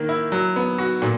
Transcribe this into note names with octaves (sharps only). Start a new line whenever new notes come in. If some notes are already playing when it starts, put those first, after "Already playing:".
Already playing: D#3 A#3
E4
F#3
B3
F#4
A#2